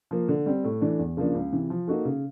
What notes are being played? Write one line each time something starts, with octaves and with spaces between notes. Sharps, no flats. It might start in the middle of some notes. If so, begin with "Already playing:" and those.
F3 A#3
D3
G3 C4
A2
E3 A3 D4
E2
C#3 F3 A#3 D4
C#2
C3 E3
F3
A#3 D#4 F#4 A4
C#3